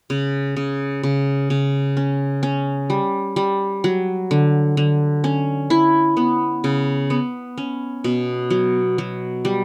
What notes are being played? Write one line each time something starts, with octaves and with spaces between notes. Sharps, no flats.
C#3
C#3
C#3
C#3
C#4
C#4
G3
G3
F#3
D3
D3
C#4
E4
B3
C#3
B3
C#4
B2
F#3
F#3
G3